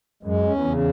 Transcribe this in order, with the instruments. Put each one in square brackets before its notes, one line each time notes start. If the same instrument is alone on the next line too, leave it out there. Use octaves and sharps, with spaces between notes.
[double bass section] F#2 [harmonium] G#3
[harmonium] C#4
[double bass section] E2
[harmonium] C#3